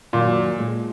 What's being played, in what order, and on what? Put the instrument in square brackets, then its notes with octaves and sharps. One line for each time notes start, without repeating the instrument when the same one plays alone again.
[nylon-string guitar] F#2 D#3 F#3 [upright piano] A#2
[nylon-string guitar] A#2 F3 G#3